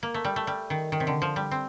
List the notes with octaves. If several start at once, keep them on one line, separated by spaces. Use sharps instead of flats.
A#3
A3
G3
A3
G3
D#3
D#3
C3
D3
F3
G3
C4